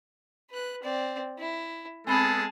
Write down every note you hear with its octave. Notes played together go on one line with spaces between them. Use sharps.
B4 F#6
C4 D5
E4
G#3 B3 C4 G#4 A4 A5 B5